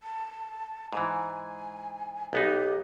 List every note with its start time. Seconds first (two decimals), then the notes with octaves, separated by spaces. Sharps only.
0.03 A5
0.93 G#2 E3 G#5
2.33 B1 B3 D#4 G4